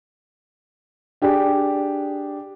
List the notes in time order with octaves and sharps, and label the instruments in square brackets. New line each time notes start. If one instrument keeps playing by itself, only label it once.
[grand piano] D4 G4 G#4